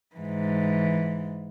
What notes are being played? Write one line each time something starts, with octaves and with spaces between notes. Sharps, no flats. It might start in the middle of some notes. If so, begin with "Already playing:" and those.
G#2 E3